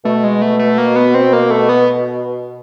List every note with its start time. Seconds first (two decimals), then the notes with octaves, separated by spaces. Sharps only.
0.04 B2 A3
0.24 G#3
0.42 A3
0.59 A3
0.78 A#3
0.96 B3
1.14 C4
1.33 A#3
1.51 A3
1.69 B3